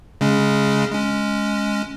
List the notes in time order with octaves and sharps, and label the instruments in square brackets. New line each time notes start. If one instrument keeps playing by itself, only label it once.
[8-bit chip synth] C#3 G#3 C#4
G#3 C#4